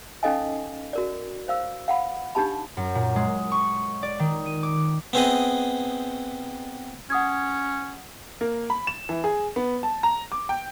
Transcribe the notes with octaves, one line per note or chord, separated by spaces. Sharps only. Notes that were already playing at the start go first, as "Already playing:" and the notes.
C#4 D#4 A4 D#5 F5 G#5
F#4 A#4 D5
C5 F5 E6
F5 F#5 B5
D4 D#4 G4 A5 B5
F#2
A#2
G#3
C#6
D5
D#3
D#7
D6
B3 C4 G#4 D#5
C#4 F#5 D#6 G#6
A#3
B5
E7
E3
G#4
B3
A5
A#5
D6
G5